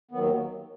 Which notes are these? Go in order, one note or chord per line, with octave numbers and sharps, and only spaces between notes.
D#2 D#3 F#3 B3